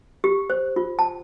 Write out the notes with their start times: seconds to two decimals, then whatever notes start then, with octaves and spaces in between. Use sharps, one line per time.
0.24 G4
0.50 C5
0.76 F4
0.99 A5